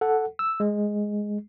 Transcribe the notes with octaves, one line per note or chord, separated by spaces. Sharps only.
A4 F#5
E6
G#3